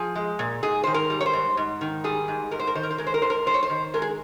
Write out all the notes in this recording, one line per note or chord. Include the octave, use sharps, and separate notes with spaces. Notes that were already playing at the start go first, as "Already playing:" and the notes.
Already playing: F3 G#4
G#3
A#2
G#2 G#4
D#3 C5
A#4
G3
C#5
C5
G#2
G#2
D#3
G3 G#4
G#2
G#2 A#4
C5
A#4
D#3 C5
A#4
C5
G#3 A#4
C5
A#4
G#2 C5
A#4
G#2 C5
C#5
C5
D#3
G#3 A#4
G#4